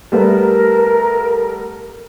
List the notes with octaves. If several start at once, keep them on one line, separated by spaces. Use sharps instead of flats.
G3 A3 B3 A#4